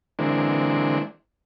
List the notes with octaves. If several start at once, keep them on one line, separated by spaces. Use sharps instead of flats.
D3 E3 G#3 A#3 C4 D4